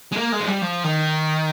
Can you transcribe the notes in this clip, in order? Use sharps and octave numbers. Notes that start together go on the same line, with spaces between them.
G#3
A#3
G#3
F3
G3
F3
D#3